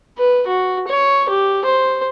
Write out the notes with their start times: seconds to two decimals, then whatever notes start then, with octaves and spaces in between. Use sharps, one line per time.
0.18 B4
0.47 F#4
0.88 C#5
1.29 G4
1.65 C5